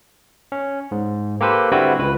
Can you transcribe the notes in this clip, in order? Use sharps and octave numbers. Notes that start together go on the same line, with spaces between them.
C#4
G#2
A#3 G4 A4 B4 C5
D3 G3 C4 E4 F#4 B4
C#2 B4